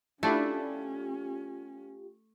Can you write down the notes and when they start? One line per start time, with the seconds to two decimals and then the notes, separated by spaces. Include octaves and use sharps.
0.23 A3 C#4 D4 E4 F4 G4